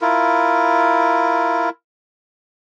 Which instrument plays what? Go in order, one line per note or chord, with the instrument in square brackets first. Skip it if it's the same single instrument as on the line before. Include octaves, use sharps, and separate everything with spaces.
[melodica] E4 F4 A#4